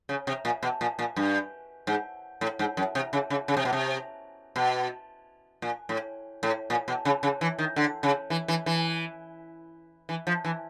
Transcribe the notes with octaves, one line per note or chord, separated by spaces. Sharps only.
C#3
C3
A#2
B2
A#2
A#2
G2
G#2
A2
G#2
F#2
C3
C#3
C#3
C#3
C3
B2
C3
B2
A#2
A2
A2
A#2
B2
C#3
C#3
E3
D#3
D3
C#3
E3
E3
E3
E3
F3
E3